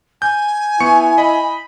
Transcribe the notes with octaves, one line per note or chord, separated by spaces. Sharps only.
G#5 G6
B3 E4 C#6 C#7
D#5 B5